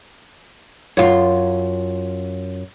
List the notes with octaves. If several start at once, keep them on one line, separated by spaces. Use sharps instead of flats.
F#2 F4